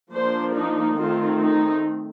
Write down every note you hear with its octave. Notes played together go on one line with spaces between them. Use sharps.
F3 A#3 D4 C5
D#4
D#3 A3 C4 F4
D#4